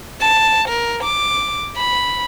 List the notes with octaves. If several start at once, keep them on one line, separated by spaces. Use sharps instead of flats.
A5
A#4
D6
B5